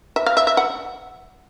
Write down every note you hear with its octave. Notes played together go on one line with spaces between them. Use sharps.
E5
F5
E5
E5
F#5